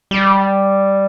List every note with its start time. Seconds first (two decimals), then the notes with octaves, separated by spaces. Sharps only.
0.11 G3